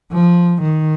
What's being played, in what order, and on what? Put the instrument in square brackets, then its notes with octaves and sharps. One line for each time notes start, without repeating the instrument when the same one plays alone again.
[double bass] F3
D#3